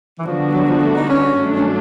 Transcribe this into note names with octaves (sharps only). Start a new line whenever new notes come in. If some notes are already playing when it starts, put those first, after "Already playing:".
E3
D3 F3 G3 B3 D4 F#4
F#3
F3
A3
D#4
C#4
G2 D#3 F#3 A3 D4
C#4